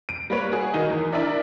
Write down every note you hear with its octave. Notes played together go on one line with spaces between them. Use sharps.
D7
G3 A#3 B4 C#5
F#4 G#4
D#3 D#4
E2
D4 E4 A#4 D5 E5